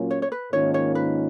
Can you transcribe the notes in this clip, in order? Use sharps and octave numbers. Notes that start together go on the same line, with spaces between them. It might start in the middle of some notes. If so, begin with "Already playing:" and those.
Already playing: A#2 F#3 A#3 C#4 F4
C#5
C#5
B4
G#2 D#3 A#3 C#4 F4 C#5
C#5
B4